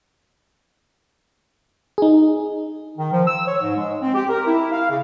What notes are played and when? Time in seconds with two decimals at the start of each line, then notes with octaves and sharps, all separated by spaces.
1.98 D#4 G#4
2.97 D#3
3.11 F3
3.27 E6
3.46 C#5
3.61 G#2
3.76 G#3
4.02 C4
4.15 G4
4.29 A#4
4.46 E4
4.72 F5
4.89 C#3